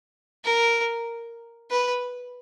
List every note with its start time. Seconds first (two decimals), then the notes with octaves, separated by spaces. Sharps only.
0.45 A#4
1.71 B4